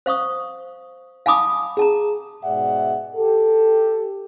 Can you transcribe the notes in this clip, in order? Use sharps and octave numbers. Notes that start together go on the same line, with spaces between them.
C5 F5 C#6 D#6
F5 G#5 A5 B5 D6 D#6
G#4 A5 A#5
G#2 B2 G#4 D5 E5 F#5
G4 A4